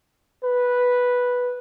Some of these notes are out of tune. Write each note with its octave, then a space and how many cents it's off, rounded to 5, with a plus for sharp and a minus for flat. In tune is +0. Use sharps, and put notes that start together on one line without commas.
B4 -5